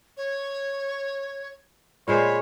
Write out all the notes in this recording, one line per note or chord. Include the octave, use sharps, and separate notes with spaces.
C#5
A#2 G#3 C5 C#5 B5